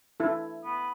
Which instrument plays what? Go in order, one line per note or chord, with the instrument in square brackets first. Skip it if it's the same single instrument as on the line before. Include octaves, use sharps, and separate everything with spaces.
[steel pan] E4 A4
[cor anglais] B3